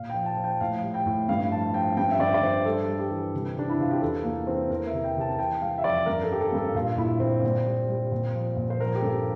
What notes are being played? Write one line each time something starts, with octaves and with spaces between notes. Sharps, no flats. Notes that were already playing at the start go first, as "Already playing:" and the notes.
Already playing: A#2 F5
F3 G5
A5
F3
G5
A2 F5
G3
G5
A2
G2 F5
F3 A5
F3 G5
G2 G5
E5
G2 D5
D5
G2 C5
G3 A4
G3
G4
E3
C3
C3 D4
E4
C3 F4
G4
E2 A4
E3 A#3
E3 C4
E2 A#4
E5
C3
G5
C3 A5
A5
E3 G5
G3 F5
E5
F2 D5
G2 A#4
A4
F3 G4
A4
G2
A4
A#2 F4
A#2 E4
A#2 C4
A#2
G3
G3
A#2
F3
A#2
C5
F3 A#4
G4
G2 A4